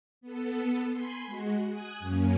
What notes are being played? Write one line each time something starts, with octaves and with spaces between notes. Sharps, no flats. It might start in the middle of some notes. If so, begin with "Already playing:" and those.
B3 A4
G#5 B5 C6
G#3 F#4
G#5 D#6 F#6
F#2 A#3 C#4